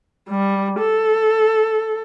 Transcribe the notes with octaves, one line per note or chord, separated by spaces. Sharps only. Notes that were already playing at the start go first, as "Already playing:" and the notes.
G3
A4